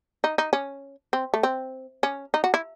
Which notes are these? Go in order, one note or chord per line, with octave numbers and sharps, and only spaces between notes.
D#4
D#4
C#4
C4
A3
C4
C#4
D#4
F#4
E4